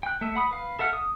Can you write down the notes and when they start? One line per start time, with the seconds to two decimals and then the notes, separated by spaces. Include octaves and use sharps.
0.03 G5 F#6
0.21 A3 E5
0.35 F#5 B5 D#6
0.51 B4 F5
0.79 A4 E5 F#5 F6
0.93 D#6